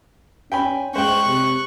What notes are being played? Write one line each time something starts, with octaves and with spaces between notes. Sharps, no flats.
C#4 G5 G#5 B5
G#3 C5 G5 C#6 F#6
C3